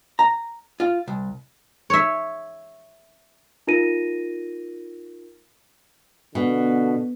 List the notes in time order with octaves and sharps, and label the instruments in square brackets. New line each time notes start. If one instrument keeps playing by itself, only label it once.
[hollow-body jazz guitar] A#5
F4
C2
[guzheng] C#5 E5
[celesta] D#4 F4 A#4 A#6 D#7
[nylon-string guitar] B2 [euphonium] D3